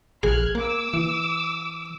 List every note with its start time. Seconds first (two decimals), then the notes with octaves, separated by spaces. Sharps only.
0.23 A#1 G#4 F6 F#6 G#6
0.55 A#3 D6 E6
0.94 E3